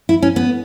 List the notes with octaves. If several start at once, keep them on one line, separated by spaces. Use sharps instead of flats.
E4
C#4
B3